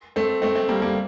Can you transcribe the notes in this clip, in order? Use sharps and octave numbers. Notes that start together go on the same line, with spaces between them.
A3 C4
A3 C4
A3 C4
G3 A#3
G3 A#3